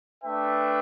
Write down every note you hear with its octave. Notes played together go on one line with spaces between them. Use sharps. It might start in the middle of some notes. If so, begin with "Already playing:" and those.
A3 D4 B4 E5 G5